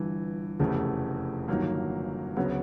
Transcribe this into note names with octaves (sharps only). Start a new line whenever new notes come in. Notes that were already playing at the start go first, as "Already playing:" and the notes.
Already playing: G1 G2 E3
F1 E2 C#3 E3 A3
G1 G2 D#3 F#3 A#3
D2 C#3 F#3 B3